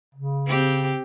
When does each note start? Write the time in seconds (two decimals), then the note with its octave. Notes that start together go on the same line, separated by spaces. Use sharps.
0.15 C#3
0.47 C4 G4